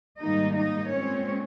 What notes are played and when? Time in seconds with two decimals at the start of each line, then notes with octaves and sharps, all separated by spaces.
0.20 G#2 D#3 G3 A#3 D#4 D#5
0.57 D#4 D#5
0.92 A#2 G#3 C4 C#4 C#5